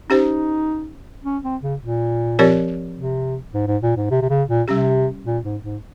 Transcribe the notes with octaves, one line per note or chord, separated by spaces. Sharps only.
C#4 D#4 G4 C5
C#4
C4
C#3
A#2
F3 C4 G4 A#4 C#5
C3
G#2
G#2
A#2
G#2
C3
C3
C#3
A#2
C3 G3 C#4 G4
A#2
G#2
G#2